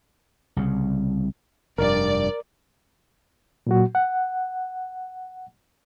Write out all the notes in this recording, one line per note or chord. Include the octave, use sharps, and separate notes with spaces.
C2 C#3
F1 G2 A#4 D5
A#2 F#3 F#4
F#5